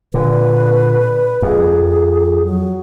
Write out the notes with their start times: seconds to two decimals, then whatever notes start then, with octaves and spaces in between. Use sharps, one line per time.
0.14 A#2 D3 B4
1.42 F2 G#4
2.45 F#3